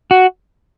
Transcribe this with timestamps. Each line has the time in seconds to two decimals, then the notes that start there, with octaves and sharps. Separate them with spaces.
0.11 F#4